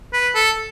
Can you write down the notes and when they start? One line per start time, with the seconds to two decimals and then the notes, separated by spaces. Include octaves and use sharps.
0.13 B4
0.35 A4